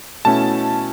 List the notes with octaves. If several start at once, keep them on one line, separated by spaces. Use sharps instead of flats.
B2 A3 C#4 E4 A5